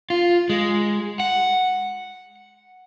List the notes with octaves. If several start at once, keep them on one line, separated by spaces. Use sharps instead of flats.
F4
G#3
F#5